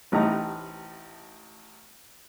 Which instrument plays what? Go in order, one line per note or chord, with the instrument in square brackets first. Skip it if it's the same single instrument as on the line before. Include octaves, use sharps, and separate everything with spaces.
[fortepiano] A1 A2 C3 D#4 A#5